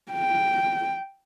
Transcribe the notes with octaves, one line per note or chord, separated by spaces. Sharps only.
G5